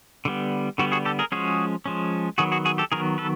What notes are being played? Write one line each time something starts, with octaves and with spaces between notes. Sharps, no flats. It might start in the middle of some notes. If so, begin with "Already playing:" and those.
D3 G3 B3
D3 G3 B3 F#4
F#4 G#4
G4 A4
G#4 A#4
F3 G#3 C#4 F#4 G#4
F3 G#3 C#4
D#3 F#3 B3 F#4 G#4
F#4 G#4
F#4 G#4
G4 A4
D#3 F#3 B3 G#4 A#4
A4 B4